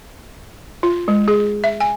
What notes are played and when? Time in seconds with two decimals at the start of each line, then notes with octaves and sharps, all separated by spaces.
0.83 F4
1.08 G#3
1.28 G#4
1.64 E5
1.80 G#5